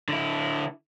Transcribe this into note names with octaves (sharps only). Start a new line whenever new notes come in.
D3 E4